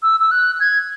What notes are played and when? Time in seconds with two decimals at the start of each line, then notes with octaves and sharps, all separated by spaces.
0.03 E6
0.20 E6
0.31 F#6
0.60 G#6